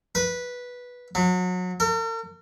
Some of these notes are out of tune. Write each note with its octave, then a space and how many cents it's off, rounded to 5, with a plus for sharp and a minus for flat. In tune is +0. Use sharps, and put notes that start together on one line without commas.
B4 -10
F#3 -30
A#4 -45